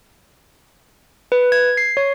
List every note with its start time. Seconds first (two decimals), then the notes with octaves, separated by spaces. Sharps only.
1.32 B4
1.52 G#6
1.77 C7
1.97 C#5